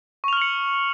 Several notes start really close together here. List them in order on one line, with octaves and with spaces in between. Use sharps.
C#6 F7 F6 F#7 C#7